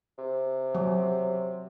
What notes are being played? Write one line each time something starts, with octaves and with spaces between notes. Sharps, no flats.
C3
F#3